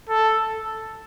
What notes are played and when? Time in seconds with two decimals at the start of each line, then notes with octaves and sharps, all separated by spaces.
0.09 A4